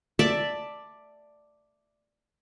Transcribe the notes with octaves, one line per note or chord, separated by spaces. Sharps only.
D5 E5 A5 D6